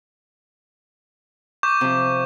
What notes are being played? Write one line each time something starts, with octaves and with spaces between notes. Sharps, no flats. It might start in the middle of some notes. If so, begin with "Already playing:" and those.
C#6 D6 G6
C3 F3